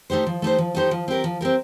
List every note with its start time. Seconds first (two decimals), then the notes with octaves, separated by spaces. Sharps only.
0.10 A3 D#4 G4 C5
0.27 F3
0.42 A3 D#4 G4 C5
0.58 F3
0.75 A3 D#4 G4 C5
0.91 F3
1.08 C4 G4 A#4
1.24 F3
1.41 C4 G4 A#4